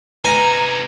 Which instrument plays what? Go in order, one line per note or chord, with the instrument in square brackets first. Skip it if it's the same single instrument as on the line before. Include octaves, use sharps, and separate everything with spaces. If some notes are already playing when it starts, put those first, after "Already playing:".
[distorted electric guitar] C3 D#4 [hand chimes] B4 [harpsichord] G#5 [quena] A#5